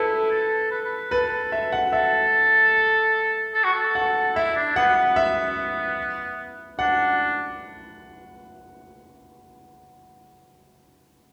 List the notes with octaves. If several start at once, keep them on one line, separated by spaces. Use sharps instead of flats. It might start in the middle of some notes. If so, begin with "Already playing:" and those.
Already playing: E4 A4 B4
A4
B4
B4
A4 B4
E5
F#5
A4 E5
A4
F#4
A4
F#5
E4 E5
D4
B3 F#5
B3
E5
D4 F#5